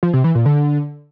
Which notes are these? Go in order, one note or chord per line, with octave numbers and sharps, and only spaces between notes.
F3
C3
E3
A#2
D3